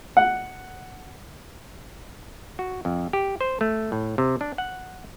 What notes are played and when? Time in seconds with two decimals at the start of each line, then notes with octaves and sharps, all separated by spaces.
0.17 F#5
2.59 F#4
2.85 F2
3.13 G4
3.41 C5
3.61 A3
3.92 A2
4.18 C3
4.41 D4
4.58 F#5